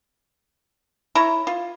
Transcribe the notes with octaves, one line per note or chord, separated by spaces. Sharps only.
E4 C#5 A#5
F4